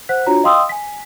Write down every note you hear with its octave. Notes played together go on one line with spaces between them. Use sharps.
C5 F#5 F#6 B6
D4 F4 F#4 C#5 A#5
D#5 F5 G5 C6 D#6 E6
G#5 B6